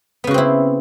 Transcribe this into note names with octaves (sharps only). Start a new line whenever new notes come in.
C#3 B3 C4 E4 F#4